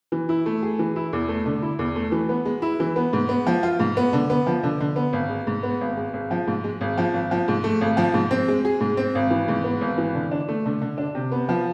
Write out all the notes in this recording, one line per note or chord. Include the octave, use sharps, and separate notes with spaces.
E3
E4
A3
G#4
E3
E4
E2
A3
D3
E4
E2
A3
E3
B3
G#3
E4
E3
B3
G#2
B3
F3
F4
G#2
B3
D3
B3
F3
D3
D3
B3
G#1
G#3
G#2
B3
G#1
G#3
G#1
F3
G#2
G#3
G#1
F3
G#1
F3
G#2
A3
G#1
F3
G#2
C4
G#3
G#4
G#2
C4
G#1
E3
G#2
B3
G#1
E3
D3
D4
A3
D3
D3
D4
C3
B3
F3